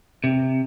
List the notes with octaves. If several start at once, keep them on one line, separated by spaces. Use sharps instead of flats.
C3